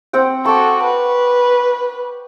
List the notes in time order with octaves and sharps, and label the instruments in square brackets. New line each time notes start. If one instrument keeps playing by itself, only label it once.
[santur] C4 F#5 G5
[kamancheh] F#4 A4 [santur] C#6 D6
[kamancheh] B4